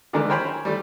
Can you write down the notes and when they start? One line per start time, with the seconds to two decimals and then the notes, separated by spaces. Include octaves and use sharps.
0.13 D3 E3 G#3 A3 D4 A#4
0.30 A#4 C5 C#5 G5 G#5 B5
0.65 G3 A3